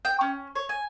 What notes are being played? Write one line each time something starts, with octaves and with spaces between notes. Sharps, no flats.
G5
C#4
C#5
G#5